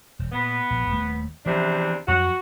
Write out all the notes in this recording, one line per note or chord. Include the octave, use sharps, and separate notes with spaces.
E1
A#2 B3
A#1
D#1 A3
E2 C3 E3 F3 D4
F2 F#3 C#4 F#4